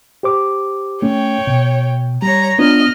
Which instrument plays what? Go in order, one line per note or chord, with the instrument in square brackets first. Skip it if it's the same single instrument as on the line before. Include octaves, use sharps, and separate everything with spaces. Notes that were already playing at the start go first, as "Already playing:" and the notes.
[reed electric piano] G4 C5 D6
[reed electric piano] A3 C#4 [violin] C#5 G5
[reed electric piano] B2
[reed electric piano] G3 [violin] C#5 A#5
[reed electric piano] B3 D4 F4 [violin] D#5 F6